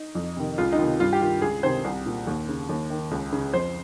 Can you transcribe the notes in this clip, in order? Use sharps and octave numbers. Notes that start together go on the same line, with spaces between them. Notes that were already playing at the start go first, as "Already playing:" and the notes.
Already playing: D#4
F2
C3 D#3
C#2 F4
D#4
C3 D#3 F4
G2 F4
G4
D#3 F4
C#2 G#4
C3 D#3 C5
C2
A#2
D#2
C#3
D#2
D#3
C#2
C#3
F2 C5